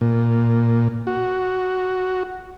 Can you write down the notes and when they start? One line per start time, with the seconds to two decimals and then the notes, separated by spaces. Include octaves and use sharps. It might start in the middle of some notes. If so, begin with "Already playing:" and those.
0.01 A#2
1.07 F#4